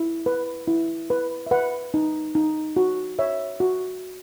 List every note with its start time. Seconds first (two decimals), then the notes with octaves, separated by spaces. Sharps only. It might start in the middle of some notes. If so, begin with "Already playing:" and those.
Already playing: E4
0.26 B4
0.68 E4
1.10 B4
1.47 E5
1.51 B4 F#5
1.94 D#4
2.35 D#4
2.76 F#4
3.19 C#5 E5
3.60 F#4